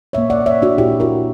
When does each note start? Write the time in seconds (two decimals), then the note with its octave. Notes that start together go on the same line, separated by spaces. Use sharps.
0.13 A#2 A#3 C#5 E5
0.30 D5 F#5
0.46 C#5 E5
0.62 D4 F#4
0.78 A#2 A#3 E4 G4
1.00 F#4 A#4